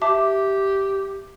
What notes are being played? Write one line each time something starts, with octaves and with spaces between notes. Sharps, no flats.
G4 E5 A5 D6